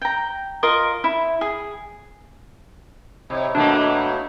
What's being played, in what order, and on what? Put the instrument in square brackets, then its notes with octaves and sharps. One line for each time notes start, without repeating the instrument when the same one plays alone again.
[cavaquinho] G5 A#5
F4 A#4 D#5 D#6
E4
G#4
[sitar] C3 [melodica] D#4 E4 C#5
[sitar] B2 A3 A#3 [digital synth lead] D4